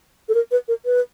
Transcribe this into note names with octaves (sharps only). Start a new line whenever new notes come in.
A4
A#4
B4
A#4
B4